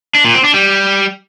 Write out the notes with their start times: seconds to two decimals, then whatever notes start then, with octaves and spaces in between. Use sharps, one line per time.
0.15 D4
0.24 A#2
0.34 C4
0.44 D4
0.54 G3